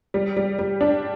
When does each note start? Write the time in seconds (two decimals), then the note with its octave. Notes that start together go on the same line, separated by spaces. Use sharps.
0.14 G3
0.37 G3
0.59 G3
0.81 D4